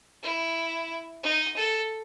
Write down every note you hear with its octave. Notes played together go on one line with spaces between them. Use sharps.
E4
D#4
A4